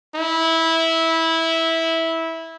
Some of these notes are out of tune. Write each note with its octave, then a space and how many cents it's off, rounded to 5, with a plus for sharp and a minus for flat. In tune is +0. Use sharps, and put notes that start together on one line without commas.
E4 -15